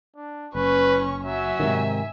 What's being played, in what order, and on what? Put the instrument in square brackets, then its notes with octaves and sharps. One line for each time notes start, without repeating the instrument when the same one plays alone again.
[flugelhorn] D4
[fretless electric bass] F#1 [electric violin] C#4 C#6 [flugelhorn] B4
[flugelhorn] F#3 [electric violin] E5 G#5
[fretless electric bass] G#2 C3 D#3